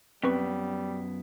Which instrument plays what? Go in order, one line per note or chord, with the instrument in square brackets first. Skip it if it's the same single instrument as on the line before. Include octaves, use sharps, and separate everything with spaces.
[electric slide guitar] F#2 B3 [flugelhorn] G3 [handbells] C4 B4 C#6